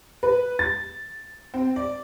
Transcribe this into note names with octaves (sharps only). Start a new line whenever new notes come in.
B4
A6
C4
D5